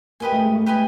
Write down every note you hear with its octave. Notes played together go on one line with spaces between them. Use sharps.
A#3 G4 B4 D#5 G#5
A3
G#3
A3
G4 B4 D#5 G#5